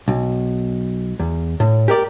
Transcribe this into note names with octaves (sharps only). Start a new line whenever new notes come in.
B1
E2
A2
G4 A#4 D5